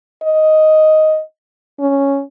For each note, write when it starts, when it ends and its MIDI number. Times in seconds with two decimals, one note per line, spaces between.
0.23 1.21 75
1.80 2.22 61